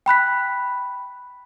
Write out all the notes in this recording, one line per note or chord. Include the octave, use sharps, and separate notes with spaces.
G5 B5 F#6 B6